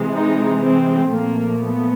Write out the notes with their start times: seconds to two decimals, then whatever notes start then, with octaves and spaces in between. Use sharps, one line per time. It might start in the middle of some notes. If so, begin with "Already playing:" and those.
Already playing: C3 E3 G#3
0.14 D#4
0.63 C4
1.12 A#2 F3 A3 A#3
1.61 B3